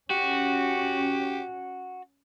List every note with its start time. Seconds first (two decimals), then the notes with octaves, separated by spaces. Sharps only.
0.10 C#4 F#4 G4